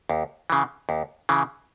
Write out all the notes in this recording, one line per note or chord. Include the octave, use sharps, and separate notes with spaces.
D#2
C#3 E3
D#2
C#3 E3